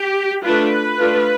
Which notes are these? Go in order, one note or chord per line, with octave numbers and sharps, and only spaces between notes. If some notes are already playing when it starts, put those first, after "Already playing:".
Already playing: G4
A3 D4 F4 B4
A3 D4 F4